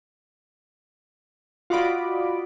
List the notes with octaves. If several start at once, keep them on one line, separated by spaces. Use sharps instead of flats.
F4 F#4 D5 D#5 B5 D6